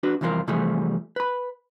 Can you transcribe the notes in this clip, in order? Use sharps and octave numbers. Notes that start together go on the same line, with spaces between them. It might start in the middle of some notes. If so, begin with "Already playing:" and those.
D4 F#4 B4
C2 F2 E3 F3 F4 A#4
C3 E3 F3 G3 A3 G#4
B4 B5